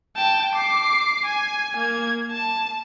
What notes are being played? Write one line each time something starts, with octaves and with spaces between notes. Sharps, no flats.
G5 A5
D6 C7
G#5
A#3 G#6
A5